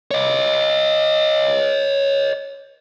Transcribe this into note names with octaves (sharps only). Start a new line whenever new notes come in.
C#5 D#5